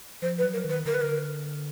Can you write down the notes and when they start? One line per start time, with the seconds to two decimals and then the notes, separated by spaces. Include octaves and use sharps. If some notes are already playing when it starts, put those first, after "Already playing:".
0.22 F3 C5
0.38 B4
0.43 F#3
0.53 A#4
0.64 D#3 B4
0.85 D3 A#4
0.94 B4
1.01 A#4